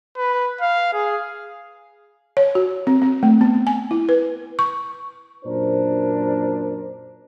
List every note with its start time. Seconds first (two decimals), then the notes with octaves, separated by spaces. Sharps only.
0.17 B4
0.61 F5
0.93 G#4
2.37 C#5
2.55 F#4
2.87 C4
3.02 C4
3.23 A3
3.41 B3
3.67 G#5
3.91 E4
4.09 B4
4.59 C#6
5.45 F#2 A#2 D4 A#4 C5